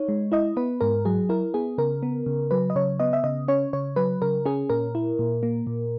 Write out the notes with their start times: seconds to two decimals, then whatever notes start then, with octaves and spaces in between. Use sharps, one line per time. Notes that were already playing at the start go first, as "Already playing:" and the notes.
Already playing: D#4 C#5
0.08 G#3
0.32 E4 D#5
0.57 B3 B4
0.81 G#2 A#4
1.05 F#3 G#4
1.29 E4 A#4
1.54 B3 G#4
1.78 C#3 A#4
2.03 B3
2.26 C#3
2.51 F#3 B4
2.70 D#5
2.76 C#3 C#5
3.00 B3 D#5
3.13 E5
3.24 C#3 D#5
3.48 C#4 C#5
3.73 C#3 C#5
3.96 F#3 B4
4.22 C#3 A#4
4.46 C#4 G#4
4.70 A#2 A#4
4.95 E4
5.19 A#2
5.43 A#3
5.67 A#2